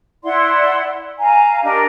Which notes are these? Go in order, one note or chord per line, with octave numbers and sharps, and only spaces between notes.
E4 D5 F#5 C6
F5 G#5 A#5
D4 G4 A#4 D#5